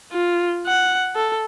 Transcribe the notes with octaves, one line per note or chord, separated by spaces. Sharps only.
F4
F#5
A4